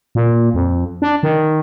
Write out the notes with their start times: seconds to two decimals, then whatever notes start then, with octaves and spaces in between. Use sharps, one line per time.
0.15 A#2
0.54 F2
1.02 D4
1.23 D#3